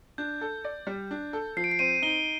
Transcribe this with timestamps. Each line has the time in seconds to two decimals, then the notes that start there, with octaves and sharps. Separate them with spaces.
0.18 D4 G6
0.41 A4
0.64 D5
0.87 G3
1.11 D4
1.33 A4
1.57 F3 C7
1.64 D7
1.72 C7
1.79 C4 D#7
2.02 D#4 G7